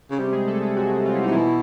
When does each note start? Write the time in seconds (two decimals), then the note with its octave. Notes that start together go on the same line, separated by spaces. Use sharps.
0.11 C#3
0.18 C3 G3 G4
0.32 G#3 G#4
0.47 A3 A4
0.62 G#3 G#4
0.77 F#3 F#4
1.06 F4
1.15 E4
1.24 C3 D#4
1.32 B2 E3 E4